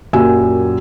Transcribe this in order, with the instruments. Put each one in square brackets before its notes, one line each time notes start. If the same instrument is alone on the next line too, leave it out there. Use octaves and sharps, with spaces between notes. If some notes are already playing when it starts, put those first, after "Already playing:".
[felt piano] F#2 A#2 F#3 G4 G#5 E6